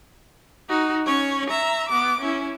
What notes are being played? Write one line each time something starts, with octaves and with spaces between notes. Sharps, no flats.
D#4 F#4
C#4 C#5
E5 A#5
B3 D6
C#4 E4